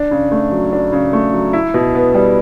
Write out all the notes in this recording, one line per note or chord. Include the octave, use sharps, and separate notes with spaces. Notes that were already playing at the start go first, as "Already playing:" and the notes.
Already playing: D4
C#3
A3
F#3
D4
C#3
A3
F#3
E4
B2
B3
G3